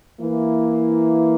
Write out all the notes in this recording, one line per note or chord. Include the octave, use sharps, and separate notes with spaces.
E3 A#3 E4